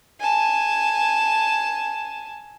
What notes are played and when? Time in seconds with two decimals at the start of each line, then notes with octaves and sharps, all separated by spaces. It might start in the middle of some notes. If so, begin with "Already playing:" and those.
0.20 G#5 A5